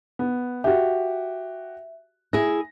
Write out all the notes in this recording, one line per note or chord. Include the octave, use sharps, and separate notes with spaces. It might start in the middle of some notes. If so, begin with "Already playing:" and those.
B3
F#4 G4 E5
E4 G#4 A#6